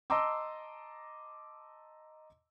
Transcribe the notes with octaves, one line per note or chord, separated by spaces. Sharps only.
D#5 A5 A#5 C6 D6 E6